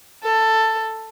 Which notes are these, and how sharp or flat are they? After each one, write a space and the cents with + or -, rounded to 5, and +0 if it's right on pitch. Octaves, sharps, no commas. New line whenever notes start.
A4 +10